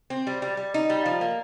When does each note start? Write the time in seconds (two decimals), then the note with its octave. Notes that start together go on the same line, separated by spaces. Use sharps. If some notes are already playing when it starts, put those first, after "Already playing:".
0.10 C4
0.27 G3
0.42 G3
0.57 G3
0.74 D#4
0.90 G3
1.06 F3
1.21 A#3